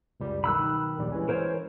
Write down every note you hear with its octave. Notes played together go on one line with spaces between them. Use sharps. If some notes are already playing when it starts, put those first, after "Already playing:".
C#2 F#2 G3
B1 D#3 B5 E6 F#6
A#1 D#2 G3
E3 G#3 C#4
A#4 C5 C#5